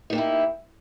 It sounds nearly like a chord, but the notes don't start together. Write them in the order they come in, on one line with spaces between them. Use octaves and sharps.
D#4 A#3 G4 E4